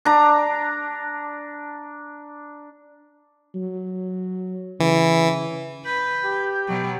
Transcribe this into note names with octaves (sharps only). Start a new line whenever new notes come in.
D4 A#5
F#3
C#3 E3
B4 G6
G4
B2 F#3